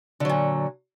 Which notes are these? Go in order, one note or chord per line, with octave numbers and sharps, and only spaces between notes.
A#2 D3 F#3